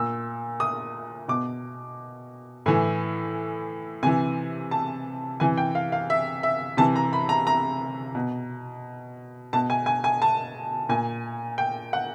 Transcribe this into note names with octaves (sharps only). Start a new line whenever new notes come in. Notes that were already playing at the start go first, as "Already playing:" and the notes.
Already playing: A#2 E6
D#6
B2 D6
A2 E3 G#5
C3 E3 G#5
A5
C3 E3 G#5
G5
F5
F5
E5
E5
C3 E3 A5
A#5
B5
A#5
A#5
B2
B2 A5
G#5
G#5
G#5
A5
A#2 G#5
G5
F#5